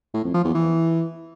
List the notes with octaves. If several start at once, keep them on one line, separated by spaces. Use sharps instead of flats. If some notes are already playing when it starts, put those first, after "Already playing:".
A2
F2
F3
E2
E3